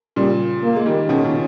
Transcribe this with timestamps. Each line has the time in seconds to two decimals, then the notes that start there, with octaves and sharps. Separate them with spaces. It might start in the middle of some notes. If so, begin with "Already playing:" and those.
0.16 A#2 C#3 G3
0.63 A#3
0.76 G#3
0.86 D#3 G3
1.09 B2 D#3 C#4
1.25 A#2 C#3